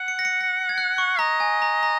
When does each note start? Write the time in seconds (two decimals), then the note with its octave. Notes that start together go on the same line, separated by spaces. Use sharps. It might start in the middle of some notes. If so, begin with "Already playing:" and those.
Already playing: F#5
0.08 C#7
0.19 A#6
0.25 C#7
0.41 A#6
0.69 G#6
0.78 F#6
0.98 C#6
1.19 D#5 A#5
1.40 G#5
1.62 A#5
1.83 A#5